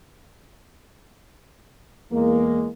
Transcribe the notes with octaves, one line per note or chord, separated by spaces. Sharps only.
E2 G#3 A#3